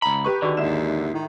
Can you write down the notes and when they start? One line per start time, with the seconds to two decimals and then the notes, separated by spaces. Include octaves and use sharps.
0.02 C#2 A#5 B5
0.24 G4 B4 C#6
0.42 D3 D#3 F#4 G#4 D5
0.57 D#2 G#2 E4 D5 E7
1.14 A2 D#3